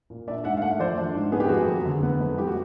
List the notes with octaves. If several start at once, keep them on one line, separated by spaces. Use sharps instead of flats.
A#2
D4 D5 E5
G#2 E5 F#5
F5
A3 E5 F#5
F3 C5 D5
D4
G#2
B3 G#4
G4
F2 F#4 G#4
F#3
D3
B3
F2
G3 G4
F#4